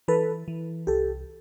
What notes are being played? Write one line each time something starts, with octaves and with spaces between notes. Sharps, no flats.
E3 A4 B4
E3
C2 G4 A4